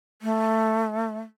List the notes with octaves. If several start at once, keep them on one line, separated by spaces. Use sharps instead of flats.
A3